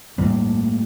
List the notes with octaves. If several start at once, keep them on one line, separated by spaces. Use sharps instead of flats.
A2 G3 A#3